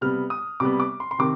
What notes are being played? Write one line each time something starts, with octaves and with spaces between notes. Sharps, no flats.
C3 G3 B3 F6
D#6
C3 G3 B3 D6
D6
C6
C6
C3 D#3 D6